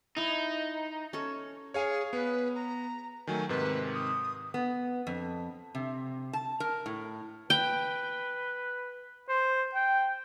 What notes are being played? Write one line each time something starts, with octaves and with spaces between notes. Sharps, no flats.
D#4 E4
C#4 A4 C#5
G#4 C#5 F5 G#5
B3 B4
A#5
D#3 F#3 A3 G#5
G#2 C3 D#3 B4
D#6
B3
F2
C3
A5
A#4
A2
B4 G5
C5
G5